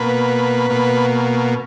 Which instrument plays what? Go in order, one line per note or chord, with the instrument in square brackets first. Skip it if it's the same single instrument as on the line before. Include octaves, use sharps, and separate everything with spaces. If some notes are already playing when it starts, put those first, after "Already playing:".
Already playing: [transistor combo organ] B2 A#3 B4
B2 A#3